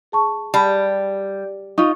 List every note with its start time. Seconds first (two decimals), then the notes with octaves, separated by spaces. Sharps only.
0.12 G#4 A5 C#6
0.54 G3 A5 B5
1.78 D#4 F4 C#6